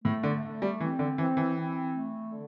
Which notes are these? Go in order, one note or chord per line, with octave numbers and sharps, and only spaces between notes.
A2 A3
D3
A3
G3
E3 C4
D3
E3 C4
E3
C4
A3
D3